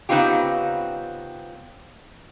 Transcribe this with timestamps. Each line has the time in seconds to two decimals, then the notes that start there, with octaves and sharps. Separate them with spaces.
0.09 C#3 B3 C4 D#4 F4 G4